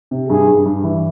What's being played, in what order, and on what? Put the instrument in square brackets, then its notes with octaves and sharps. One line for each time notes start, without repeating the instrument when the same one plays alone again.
[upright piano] C3
[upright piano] G2 [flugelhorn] G#4
[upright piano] G2
G2
E3